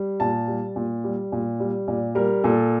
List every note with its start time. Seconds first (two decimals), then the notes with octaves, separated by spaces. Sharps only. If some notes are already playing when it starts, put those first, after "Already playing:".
Already playing: G3
0.20 A#2 A5
0.48 G3
0.76 A#2
1.04 G3
1.32 A#2
1.60 G3
1.88 A#2 D5
2.15 G3 A#4
2.44 A#2 A4